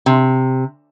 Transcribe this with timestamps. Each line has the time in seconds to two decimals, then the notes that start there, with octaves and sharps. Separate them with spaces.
0.06 C3